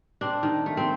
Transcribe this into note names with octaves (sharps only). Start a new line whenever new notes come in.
C4 D4
D#3
A3
C4